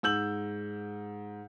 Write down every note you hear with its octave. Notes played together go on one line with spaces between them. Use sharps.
G#2 E6 G6 F#7